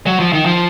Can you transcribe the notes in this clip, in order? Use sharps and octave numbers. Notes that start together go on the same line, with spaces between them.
F#3
F3
D#3
F3